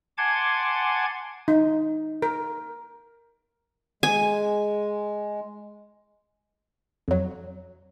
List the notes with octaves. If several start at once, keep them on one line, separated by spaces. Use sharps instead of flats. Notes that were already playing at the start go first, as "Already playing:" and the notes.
F#5 G#5 A5 C6 D6 G#6
D#4
A#4
G#3 G#5
F2 F#3